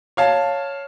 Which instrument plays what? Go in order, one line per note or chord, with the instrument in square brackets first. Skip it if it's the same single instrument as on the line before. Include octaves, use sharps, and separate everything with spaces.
[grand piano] C#5 F5 A5